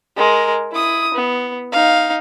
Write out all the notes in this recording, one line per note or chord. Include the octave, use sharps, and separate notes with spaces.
G#3 A#4
E4 D#6
B3
D#4 F5